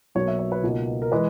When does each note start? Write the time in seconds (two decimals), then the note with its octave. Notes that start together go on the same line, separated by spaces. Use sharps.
0.15 B1 B2 F#3 A#3 C#5
0.28 E5
0.39 C#5
0.52 B4
0.63 C#2 B2 A#3 D#4
1.02 A#4
1.12 E3 G#3 B4